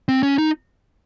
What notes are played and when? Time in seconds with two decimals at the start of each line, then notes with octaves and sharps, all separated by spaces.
0.08 C4
0.23 C#4
0.38 D#4